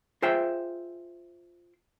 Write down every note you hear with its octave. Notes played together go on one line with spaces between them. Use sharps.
F4 G#4 C5 E5 G5